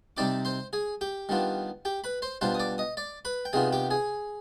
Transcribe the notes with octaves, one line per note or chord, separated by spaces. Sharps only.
C3 G3 C4 D#4 D5 D6
C5 C6
G#4 G#5
G4 G5
D#3 G3 B3 D4 F4
G4 G5
B4 B5
C5 C6
B2 G3 D4 F4 C5 C6
D#6
D5 D6
D#5 D#6
D5 D6
B4 B5
G5
C3 D#3 B3 F4 G#4 G#5
G4 G5
G#4 G#5